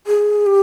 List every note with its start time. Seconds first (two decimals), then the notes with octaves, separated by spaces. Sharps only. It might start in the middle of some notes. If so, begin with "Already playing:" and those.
0.07 G#4
0.47 G4